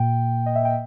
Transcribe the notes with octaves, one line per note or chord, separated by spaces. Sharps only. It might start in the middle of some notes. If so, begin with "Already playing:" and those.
Already playing: A#2 A#3 G5
D#5
E5
G5